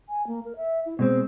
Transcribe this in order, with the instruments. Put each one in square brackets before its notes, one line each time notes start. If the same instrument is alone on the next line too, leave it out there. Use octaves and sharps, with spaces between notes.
[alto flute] G#5
A#3
A#4
E5
E4
[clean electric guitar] B2 G#3 C4 [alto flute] C5